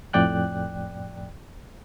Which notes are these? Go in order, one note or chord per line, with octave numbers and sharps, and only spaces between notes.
F2 A2 D5 G5 F#6